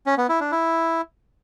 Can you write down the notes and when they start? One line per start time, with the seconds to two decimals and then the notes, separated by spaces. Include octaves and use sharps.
0.06 C#4
0.18 B3
0.29 E4
0.40 D4
0.52 E4